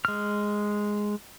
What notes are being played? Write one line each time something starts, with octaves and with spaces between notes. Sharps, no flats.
G#3 F6